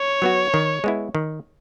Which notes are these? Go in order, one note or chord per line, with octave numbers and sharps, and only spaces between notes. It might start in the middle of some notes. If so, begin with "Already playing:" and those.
Already playing: C#5
F#3 B3 F#4
D#3
G#3 B3 E4
D#3